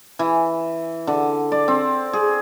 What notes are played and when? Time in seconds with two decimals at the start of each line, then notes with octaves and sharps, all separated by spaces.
0.19 E3
1.07 D3
1.52 D5
1.68 C4
2.13 G#4